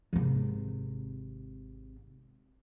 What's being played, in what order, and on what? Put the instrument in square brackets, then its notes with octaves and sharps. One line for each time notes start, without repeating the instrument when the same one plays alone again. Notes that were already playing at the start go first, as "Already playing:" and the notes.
[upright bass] G#1 C3